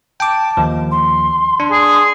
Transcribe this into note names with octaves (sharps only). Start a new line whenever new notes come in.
G5 A5 D6
D#2 F3
C6
D4
G#4